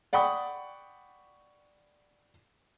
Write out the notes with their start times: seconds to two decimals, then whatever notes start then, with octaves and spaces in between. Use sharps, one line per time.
0.13 D5 F#5 G5 B5 C#6 D#6